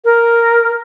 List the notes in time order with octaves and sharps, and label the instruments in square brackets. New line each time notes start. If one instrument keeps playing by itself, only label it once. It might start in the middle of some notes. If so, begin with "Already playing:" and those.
[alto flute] A#4